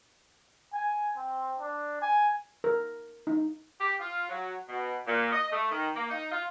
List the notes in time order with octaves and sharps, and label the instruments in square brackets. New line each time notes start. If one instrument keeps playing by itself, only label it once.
[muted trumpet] G#5
C4
D4
G#5
[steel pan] A#4
D#4
[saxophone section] G4
F4
F#3
B2
A#2
D#5
A3
D#3
A#3
D#4
F4